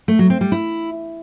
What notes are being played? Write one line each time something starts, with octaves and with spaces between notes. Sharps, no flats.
A3
F#3
C4
G3
E4